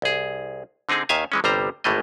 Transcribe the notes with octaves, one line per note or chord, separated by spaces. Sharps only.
C2 G#4
D3 C4 D#4 G#4
D#2 D#3 E5 F5 G#5
E3 G#3 C#4
G1 C3 G3 C5 A#5
G#1 A2 E3 A3 A#3 D#5